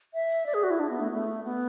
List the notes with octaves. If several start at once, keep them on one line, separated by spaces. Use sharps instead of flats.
E5
D5
G#4
F#4
E4
D4
B3
A3
A3
B3